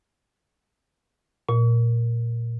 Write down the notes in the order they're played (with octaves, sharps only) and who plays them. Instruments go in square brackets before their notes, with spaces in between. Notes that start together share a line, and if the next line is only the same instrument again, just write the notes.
[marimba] A#2